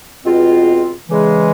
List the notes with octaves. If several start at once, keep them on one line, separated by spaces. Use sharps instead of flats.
E2 B2 G#3 C4 F4
E2 C#3 E3 G#3